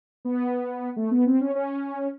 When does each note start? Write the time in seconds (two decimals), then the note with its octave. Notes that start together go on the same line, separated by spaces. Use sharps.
0.25 B3
0.96 A3
1.11 B3
1.26 C4
1.41 C#4
1.55 C#4